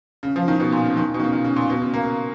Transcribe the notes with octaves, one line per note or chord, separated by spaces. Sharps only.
C#3
F3
D#3
B2
A#2
C#3
D#3
B2
D#3
C#3
D#3
C#3
A#2
B2
C#3
A#3